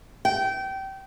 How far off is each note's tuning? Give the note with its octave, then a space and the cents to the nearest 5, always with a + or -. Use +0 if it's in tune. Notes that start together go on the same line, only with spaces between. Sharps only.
G5 -25